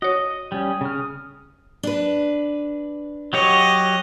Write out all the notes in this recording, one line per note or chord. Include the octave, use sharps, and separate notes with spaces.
F#4 C#5 D#5 D#6
G3 C#4
C#3 F6
D4 B4
F#3 G4 C#5 D#5